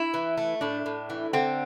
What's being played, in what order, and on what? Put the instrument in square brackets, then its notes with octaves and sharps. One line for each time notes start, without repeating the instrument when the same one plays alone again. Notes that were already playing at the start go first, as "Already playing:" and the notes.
Already playing: [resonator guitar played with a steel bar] E4
[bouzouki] E3
A3
[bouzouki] A2 [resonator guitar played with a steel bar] D4
[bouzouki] A2
E3
[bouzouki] D3 [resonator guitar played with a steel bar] C4